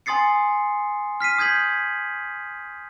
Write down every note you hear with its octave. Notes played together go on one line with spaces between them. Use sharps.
G#5 C6 D#6 A6 C7 C#7
F6 B6 C7 D#7
D#6 G6 G#6 B6 F#7